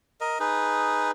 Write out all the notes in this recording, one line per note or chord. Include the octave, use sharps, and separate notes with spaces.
A#4 D#5
D#4 G#4 B4